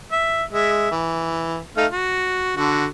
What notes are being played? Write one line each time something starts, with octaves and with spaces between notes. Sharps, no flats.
E5
G#3 E5
E3
A3 D#4 F5
F#4
D3 F#4